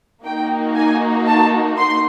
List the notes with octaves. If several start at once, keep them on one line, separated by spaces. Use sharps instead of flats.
A#3 D#4 F#4 G5
G#5
A5
C6